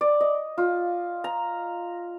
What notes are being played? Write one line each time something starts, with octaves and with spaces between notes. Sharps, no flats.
D5
D#5
F4
A#5